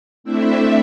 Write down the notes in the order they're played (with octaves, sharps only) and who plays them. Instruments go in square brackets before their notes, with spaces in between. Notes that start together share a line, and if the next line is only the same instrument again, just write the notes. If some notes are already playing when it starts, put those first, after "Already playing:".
[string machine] A3 C4 D4 E4 E5